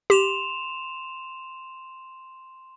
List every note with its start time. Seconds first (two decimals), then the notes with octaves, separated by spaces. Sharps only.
0.10 G4 C6 E7 F7